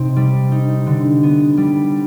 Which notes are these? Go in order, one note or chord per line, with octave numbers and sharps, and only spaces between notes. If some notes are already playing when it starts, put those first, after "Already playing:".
Already playing: C3 C4 D#4
G3
D#4
D3
B3
G3